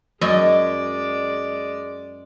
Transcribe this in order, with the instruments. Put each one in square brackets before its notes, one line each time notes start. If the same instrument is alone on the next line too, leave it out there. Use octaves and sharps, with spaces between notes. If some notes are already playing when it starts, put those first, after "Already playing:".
[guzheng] F#2 D#5 G#5 [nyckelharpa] G#3 D5